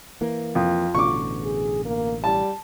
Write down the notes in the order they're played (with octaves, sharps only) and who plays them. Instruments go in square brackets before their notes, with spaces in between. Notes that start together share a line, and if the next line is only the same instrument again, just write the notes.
[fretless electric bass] E3 A#3
[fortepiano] F2 [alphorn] F4
[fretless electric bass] A1 B2 D3 [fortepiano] C#6 D6
[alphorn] G#4
A#3
[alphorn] G3 [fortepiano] A5